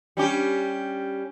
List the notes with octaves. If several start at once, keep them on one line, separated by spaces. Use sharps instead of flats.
G3 C#4 G4